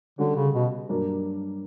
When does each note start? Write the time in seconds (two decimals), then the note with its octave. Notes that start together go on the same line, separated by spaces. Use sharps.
0.18 D3 G3 C#4 F#4
0.36 C#3
0.54 B2
0.89 G2 F#3 A#3 D4 A#4